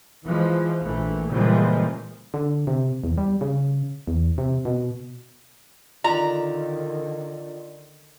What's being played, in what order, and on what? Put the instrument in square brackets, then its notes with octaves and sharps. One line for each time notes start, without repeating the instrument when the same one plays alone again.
[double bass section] E3 F3 G#3
A#1 E3 A3
A#2 C#3 E3 F3 G3 G#3
[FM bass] D3
C3
E2
G3
C#3
E2
C3
B2
[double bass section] D3 D#3 [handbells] F4 D5 [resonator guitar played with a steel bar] A#5